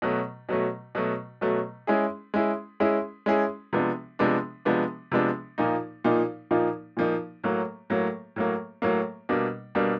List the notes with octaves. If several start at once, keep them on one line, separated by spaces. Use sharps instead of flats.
B2 F#3 A3
B2 F#3 A3
B2 F#3 A3
B2 F#3 A3
G#3 C#4 E4 G#4
G#3 C#4 E4 G#4
G#3 C#4 E4 G#4
G#3 C#4 E4 G#4
C3 F3 G#3 B3 D4
C3 F3 G#3 B3 D4
C3 F3 G#3 B3 D4
C3 F3 G#3 B3 D4
A#2 F3 A#3 D#4
A#2 F3 A#3 D#4
A#2 F3 A#3 D#4
A#2 F3 A#3 D#4
A2 F#3 A#3
A2 F#3 A#3
A2 F#3 A#3
A2 F#3 A#3
B2 G3 A#3 D4
B2 G3 A#3 D4